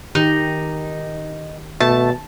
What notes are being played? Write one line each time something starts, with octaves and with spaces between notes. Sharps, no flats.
D#3 D#4 G4
B2 A3 A5